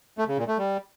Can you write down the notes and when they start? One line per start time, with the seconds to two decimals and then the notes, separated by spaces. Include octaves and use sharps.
0.18 A3
0.28 C#3
0.38 A#2
0.48 A3
0.58 G3